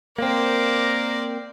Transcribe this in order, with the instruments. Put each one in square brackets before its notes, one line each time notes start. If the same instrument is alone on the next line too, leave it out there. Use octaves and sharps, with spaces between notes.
[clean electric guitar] A#3 C4 [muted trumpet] A#4 [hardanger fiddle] C5 D5